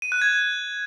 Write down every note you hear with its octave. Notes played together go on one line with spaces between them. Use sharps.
D#7
F#6
G#6